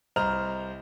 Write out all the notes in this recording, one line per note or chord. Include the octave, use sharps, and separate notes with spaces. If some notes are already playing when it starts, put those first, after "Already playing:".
C2 C5 D#5 A#5 F6 F7